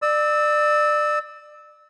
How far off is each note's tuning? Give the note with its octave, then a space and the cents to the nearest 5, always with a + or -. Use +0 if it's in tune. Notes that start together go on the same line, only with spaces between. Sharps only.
D5 +25 E6 -20